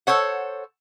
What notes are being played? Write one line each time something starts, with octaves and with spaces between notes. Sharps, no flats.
A4 C5 C#5 F#5